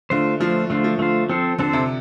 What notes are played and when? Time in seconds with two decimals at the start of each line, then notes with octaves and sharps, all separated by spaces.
0.10 D3 A3 F4 C5
0.40 F3 A3 F4 C5
0.70 D3 A3 F4 C5
0.84 F3
0.99 D3 A3 F4 C5
1.29 F3 C4 A4 C5
1.58 D3 C4 A4 C5
1.73 C3